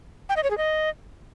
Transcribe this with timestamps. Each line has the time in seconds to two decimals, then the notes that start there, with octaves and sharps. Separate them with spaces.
0.29 G5
0.36 D#5
0.43 C#5
0.51 G#4
0.58 D#5